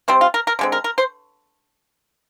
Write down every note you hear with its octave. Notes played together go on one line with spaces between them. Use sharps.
C3 G3 C4 C5
F4
A#4
A#4
D3 G#3 C4
A#4
A#4
C5